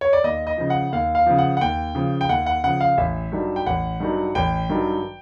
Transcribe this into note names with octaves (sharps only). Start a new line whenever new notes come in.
C#5
D5
D#2 D#5
D#5
C#3 F3
F#5
D#2 F5
F5
C#3 F3
F#5
F#5
D#2 G5
C#3 F3
G5
D#2 F#5
F#5
C#3 F3 F#5
F5
A1 E5
G2 D#3 F#3
G5
A1 F#5
G2 D#3 F#3
A1 G5
G2 D#3 F#3